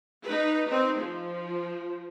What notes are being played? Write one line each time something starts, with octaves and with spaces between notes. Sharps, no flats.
D#4 B4
C4 D#4
F3